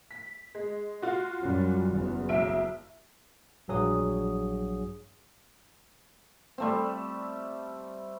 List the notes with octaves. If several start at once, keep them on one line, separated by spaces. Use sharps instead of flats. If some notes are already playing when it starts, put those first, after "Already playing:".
B6
G#3
F4 F#4
F#2 G3
F#1 E2
B1 E5 D7
A#1 G2 F#3 G#4 D#6
G3 A3 C4